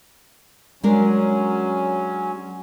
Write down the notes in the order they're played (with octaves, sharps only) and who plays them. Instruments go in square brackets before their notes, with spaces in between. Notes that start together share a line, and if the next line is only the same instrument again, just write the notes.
[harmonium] F#3 C#4 [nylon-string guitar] G#3 D4 A#4